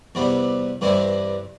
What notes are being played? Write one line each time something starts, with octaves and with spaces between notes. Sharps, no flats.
E2 C3 G3 B3
G2 E3 G3 C4 E4